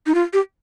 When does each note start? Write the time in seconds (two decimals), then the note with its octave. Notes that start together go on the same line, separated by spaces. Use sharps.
0.07 D#4
0.15 F4
0.33 G4